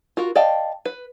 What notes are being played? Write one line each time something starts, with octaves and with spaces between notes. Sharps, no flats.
F4 F#4 A#4
D5 D#5 F5 G5 A5
B4